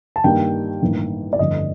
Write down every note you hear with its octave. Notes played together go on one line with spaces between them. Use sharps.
A5
G2 D#3 G3 A#3 G5
A1 G2 D#3 A#3
D5
G1 F2 D3 A3 D#5